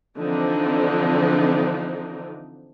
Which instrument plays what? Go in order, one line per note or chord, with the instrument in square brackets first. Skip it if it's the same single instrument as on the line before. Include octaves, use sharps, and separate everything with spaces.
[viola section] D3 E3 F3 C4 D4 D#4